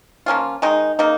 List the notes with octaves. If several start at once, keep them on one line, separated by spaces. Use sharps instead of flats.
F3 A#3 C#4 F4
D#3 G#3 D#4
C#3 A#3 D#4